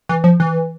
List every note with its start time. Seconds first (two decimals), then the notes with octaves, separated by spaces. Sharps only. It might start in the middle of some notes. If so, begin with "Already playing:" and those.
0.09 E3
0.24 F3
0.40 E3